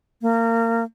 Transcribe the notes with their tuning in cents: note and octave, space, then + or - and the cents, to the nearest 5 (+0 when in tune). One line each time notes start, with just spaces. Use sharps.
A#3 -25